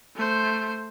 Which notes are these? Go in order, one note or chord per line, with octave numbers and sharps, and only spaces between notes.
A3 C5